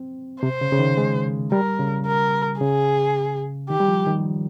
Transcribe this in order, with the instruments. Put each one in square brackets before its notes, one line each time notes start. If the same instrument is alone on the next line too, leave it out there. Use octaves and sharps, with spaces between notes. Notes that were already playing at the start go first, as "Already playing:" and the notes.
Already playing: [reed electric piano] C4
[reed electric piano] C3 [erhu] C5
[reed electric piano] C#3
C#3
D#3
G#3
[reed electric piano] G3 [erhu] A#4
[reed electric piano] C#3
[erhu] A#4
[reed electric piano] C#3 [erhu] G#4
[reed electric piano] D#3 [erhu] G4
[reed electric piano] G3
F3
D#3